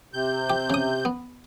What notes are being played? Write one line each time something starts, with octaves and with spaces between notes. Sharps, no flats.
C3 G6
G4
C#3 D#6
B3